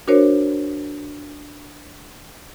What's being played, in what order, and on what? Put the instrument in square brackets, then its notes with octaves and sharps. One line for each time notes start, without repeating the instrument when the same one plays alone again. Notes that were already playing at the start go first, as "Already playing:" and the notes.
[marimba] D4 F#4 A#4 C5 C#5